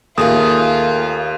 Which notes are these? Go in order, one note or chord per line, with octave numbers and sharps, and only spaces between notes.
D#2 A3 F4 G#4 A#4 D#6